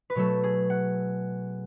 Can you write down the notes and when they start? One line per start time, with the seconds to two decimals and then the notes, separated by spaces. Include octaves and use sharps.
0.10 B4
0.15 B2 F#3 A3 A4
0.44 G#4
0.70 F#5